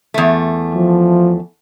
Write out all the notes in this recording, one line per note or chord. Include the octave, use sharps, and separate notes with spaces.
E2 A3
F3